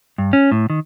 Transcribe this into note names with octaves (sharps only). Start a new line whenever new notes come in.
G2
C#4
A2
D#3